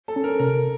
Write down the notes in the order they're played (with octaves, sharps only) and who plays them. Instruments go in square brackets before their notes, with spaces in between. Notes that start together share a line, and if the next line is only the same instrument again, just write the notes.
[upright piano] A4
[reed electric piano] C#4
[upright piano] A#4
[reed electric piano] C3 [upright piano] A#4